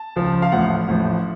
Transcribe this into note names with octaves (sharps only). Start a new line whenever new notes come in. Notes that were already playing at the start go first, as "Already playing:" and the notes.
Already playing: A5
C#2 C#3 F3
F5
A1 A2 F3 F#5
A1 A2 F3